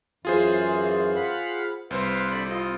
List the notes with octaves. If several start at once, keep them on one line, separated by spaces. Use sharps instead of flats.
F#2 E3 F4 G#4 C5
F5 F#5 B5
C2 B4 C5 F5
D3 D5 B5
C4 F4 D#5